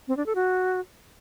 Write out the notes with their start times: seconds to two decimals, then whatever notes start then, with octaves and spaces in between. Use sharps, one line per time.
0.08 C4
0.17 D4
0.26 A4
0.35 F#4